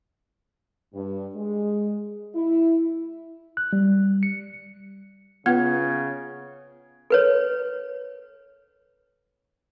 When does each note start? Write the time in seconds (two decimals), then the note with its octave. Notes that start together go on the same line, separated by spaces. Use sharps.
0.94 G2
1.35 G#3
2.35 E4
3.57 F#6
3.73 G3
4.23 C#7
5.46 C#3 B3 F4 B4 F#5 G#6
7.10 A4 B4 C#5